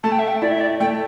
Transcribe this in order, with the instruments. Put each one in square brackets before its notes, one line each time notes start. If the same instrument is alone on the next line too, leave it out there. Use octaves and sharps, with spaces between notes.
[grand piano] A3 [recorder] A5
[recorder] G5
E5
G5
[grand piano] E4 [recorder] D5
[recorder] E5
D5
[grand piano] A3 [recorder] G5